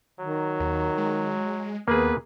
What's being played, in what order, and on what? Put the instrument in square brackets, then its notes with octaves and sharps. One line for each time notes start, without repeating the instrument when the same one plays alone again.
[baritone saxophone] D#3 [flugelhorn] F#3
[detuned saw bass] D#2
G#3
[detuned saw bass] D#2 [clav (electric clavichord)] A#3 G#4 [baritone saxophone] B3 [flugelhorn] B4